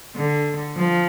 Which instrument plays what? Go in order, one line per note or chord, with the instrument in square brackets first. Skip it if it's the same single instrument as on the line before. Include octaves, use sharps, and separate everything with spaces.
[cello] D3
F3